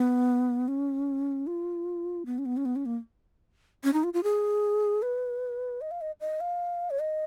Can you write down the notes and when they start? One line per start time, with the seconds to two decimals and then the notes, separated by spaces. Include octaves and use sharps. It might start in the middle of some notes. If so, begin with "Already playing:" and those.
Already playing: B3
0.68 C#4
1.47 F4
2.26 B3
2.38 C#4
2.45 B3
2.57 C#4
2.65 B3
2.76 C#4
2.86 A#3
3.84 C#4
3.93 D#4
4.04 F4
4.14 F4
4.23 G#4
5.02 B4
5.81 D#5
5.91 F5
6.01 D#5
6.21 D#5
6.41 F5
6.90 C#5
6.99 D#5